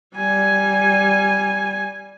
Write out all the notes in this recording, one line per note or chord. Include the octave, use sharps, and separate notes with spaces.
G3 G#5